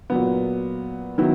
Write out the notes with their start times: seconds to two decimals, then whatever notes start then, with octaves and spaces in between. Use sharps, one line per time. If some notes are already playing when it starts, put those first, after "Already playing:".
0.10 A#2 F#3 B3
1.18 D#3 F#3 B3 E4